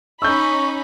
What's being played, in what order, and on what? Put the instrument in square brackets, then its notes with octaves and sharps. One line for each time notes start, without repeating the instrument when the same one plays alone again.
[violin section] C#4 D#4 B5 [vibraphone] C#6 [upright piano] E6 G6